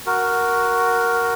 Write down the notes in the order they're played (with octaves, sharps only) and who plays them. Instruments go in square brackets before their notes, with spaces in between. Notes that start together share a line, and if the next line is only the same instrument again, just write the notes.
[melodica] F#4 A#4